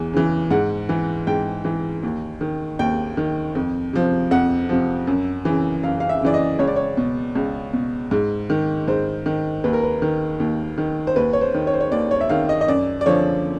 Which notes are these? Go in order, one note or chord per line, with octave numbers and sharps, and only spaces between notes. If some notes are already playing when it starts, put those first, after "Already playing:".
Already playing: E2 E3
C#3 E3
G#2 F#5
E3
G#2 G5
E3
D#2
D#3
D#2 G5
D#3
F2
C3 F3
F2 F#5
C3 F3
F#2
C#3 E3
F#2 F5
F5
E5
C#3 E3 D5
D#5
C#2 C#5
D5
C#5
B2
C#2
B2
G#2
D#3
G#2 C5
D#3
D#2 B4
A#4
B4
D#3
D#2
D#3
C5
D#2 B4
C#5
C5
D#3
C#5
C5
C#5
D#2 D5
C#5
E5
D#3 F5
D#5
D#5
F#2 D5
D5
D3 F3 C#5